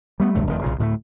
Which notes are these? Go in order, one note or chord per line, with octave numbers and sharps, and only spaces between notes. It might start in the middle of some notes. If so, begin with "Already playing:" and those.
G3 A3 B3
E1 C#2 G2 A3
F1 E2 A2 D#3
B1 A#2 C#3
D2 A2 G#3 A3